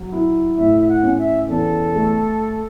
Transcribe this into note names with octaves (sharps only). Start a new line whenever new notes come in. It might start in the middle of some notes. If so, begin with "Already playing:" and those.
Already playing: F#3
E4
A2 E5
E5
F#5
C#4
E5
E2 A4
A3